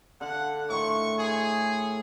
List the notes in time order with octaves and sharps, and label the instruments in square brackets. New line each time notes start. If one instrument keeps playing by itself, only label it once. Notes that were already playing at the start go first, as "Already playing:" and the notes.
[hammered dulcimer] D3 F5 A5 [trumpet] F#5
[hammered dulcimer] A2 D#3 C6 [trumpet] C#6
[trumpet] G#4